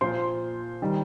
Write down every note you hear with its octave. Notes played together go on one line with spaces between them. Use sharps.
A#2 F3 C5 C6
D#3 G3